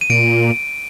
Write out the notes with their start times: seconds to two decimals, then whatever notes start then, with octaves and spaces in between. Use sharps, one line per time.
0.01 D#7
0.10 A#2 D7